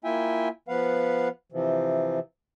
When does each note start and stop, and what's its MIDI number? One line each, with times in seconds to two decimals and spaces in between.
0.04 0.48 58
0.04 0.48 64
0.04 0.48 65
0.04 0.48 76
0.04 0.48 79
0.04 0.48 80
0.68 1.28 53
0.68 1.28 59
0.68 1.28 71
0.68 1.28 77
0.68 1.28 78
1.52 2.19 48
1.52 2.19 52
1.52 2.19 53